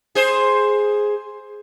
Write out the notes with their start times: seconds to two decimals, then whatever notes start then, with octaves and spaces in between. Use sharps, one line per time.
0.15 G#4 C5